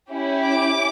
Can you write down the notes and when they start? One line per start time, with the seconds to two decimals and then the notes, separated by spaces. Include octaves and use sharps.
0.11 C#4 E4 G4
0.47 D6